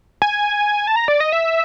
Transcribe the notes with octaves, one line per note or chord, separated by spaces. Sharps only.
G#5
A5
A#5
D5
D#5
E5